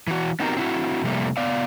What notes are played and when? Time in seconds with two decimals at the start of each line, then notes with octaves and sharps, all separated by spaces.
0.07 E3 F#4
0.40 B3 C4 D#4 F#4 G4 A#4
0.57 C4 E4 F#4
1.04 C3 F3 G3 A3 A#3
1.37 B3 D5 F5